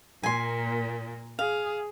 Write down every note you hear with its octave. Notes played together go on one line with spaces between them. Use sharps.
A#2 A#3 G#5 C6
G#4 F5